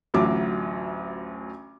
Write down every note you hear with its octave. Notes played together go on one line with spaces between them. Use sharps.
A1 D2 F#3 F4 E5 D6